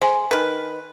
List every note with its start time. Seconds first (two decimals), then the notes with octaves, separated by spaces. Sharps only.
0.02 G#3 C5 G#5
0.31 D#3 B4